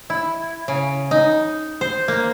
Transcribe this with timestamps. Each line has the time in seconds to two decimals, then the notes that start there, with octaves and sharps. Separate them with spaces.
0.10 E4
0.68 C#3
1.11 D#4
1.81 C5
2.08 A#3